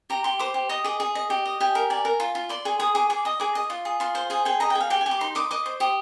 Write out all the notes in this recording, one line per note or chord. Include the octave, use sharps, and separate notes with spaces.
G4 A#5
G4 C6
C5 D6
G4
D#5 D#6
G#4 D6
G#4
D#5
G4
D#5
G4 G#5
A#4
D5 G#5
A#4
F4
F4
D5 C6
G#4
G#4 D#6
G#4 D6
G#4 D6
D#5 D#6
G#4 D6
D#5
F4
G#4
F4 C6
C5
G#4 G#5
G#4 G5
D#5 A#5
G5
G#4
F5
G4 G5
G#5
G4
D6
D#4 C6
D#5 D6
D#5 D6
C5
G4 D#6